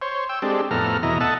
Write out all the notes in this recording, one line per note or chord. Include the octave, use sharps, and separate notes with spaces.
C5 C#5
G5 E6
G#3 C4 D4 G4 A4
F2 A2 B3 A4 A#5 F6
E2 B2 E4 D#5 A#5
A4 D#5 E5 F#5 A5